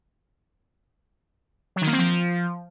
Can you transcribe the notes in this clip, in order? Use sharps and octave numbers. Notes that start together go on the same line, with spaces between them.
F#3
D#3
A#3
C4
F3